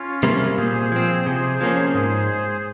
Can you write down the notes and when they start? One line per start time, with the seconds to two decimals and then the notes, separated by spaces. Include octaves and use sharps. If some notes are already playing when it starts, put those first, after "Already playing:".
Already playing: C#4 F4
0.23 C3 G3 A#3
0.57 A#2 G#4 C5
0.92 F3 C4
1.26 C3 G#4 C5
1.61 F3 A#3 C#4
1.95 G#2 G#4 C5